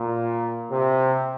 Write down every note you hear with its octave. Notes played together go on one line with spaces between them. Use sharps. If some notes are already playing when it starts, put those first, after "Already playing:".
Already playing: A#2
C3